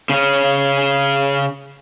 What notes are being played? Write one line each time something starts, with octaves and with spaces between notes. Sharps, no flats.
C#3 C#4